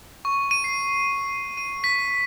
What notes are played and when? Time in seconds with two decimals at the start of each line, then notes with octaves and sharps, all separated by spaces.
0.25 C#6
0.51 D#7
0.64 C7
1.57 D#7
1.84 B6